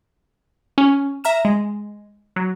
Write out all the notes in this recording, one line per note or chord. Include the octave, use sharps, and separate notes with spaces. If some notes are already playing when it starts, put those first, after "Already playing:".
C#4
E5 A#5 F6 E7
G#3
F#3